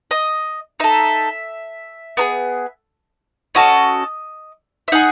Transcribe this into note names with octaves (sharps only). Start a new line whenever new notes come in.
D#5
D#4 A4 E5
B3 D#4 G#4
C#4 F#4 A4 D#5
E5
D#4 G#4 F#5